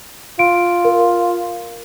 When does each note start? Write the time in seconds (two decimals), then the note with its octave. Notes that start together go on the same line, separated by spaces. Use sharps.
0.39 F4 D7
0.85 A#4